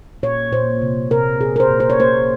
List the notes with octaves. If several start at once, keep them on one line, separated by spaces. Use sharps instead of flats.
A#2 C#5
A#2 C5
C3
C3 A#4
A#2 G#4
A#4
C5
A#2
C5
C#5
A#3 C5